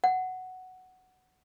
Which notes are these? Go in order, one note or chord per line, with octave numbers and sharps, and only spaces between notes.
F#5